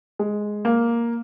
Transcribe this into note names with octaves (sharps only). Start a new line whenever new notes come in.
G#3
A#3